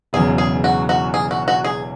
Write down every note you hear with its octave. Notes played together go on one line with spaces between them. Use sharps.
E1 E2 C#3 F#3 G#4
G#4
F#4
F#4
G#4
F#4
F#4
G#4